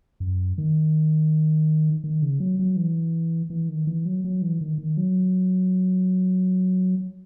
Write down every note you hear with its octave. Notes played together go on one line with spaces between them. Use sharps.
F#2
D#3
D#3
C#3
F#3
F#3
E3
E3
D#3
E3
F#3
F#3
E3
D#3
D#3
F#3